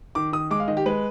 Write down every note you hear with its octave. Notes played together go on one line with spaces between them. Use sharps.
D#3 D6
D#3 D#6
G#3 D6
F5
D#3 D#5
G4
G#3 B4